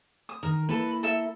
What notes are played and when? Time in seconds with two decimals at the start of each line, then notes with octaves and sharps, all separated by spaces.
0.29 D#6
0.43 D#3 A#4
0.69 A#3 E4 A4 B4
1.03 A4 E5